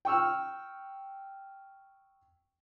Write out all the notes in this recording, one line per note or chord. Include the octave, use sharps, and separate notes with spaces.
G5 C#6 E6 F6